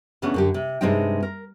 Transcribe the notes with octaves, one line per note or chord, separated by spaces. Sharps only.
C#3 E3 A3 B3 C#4 D4
F#2 D3 G4
C3
G2 C3 G#3 C4 D#4 G5
A#4